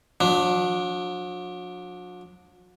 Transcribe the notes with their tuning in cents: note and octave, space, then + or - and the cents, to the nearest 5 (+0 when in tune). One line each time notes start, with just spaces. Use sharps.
F#3 -45 D4 +0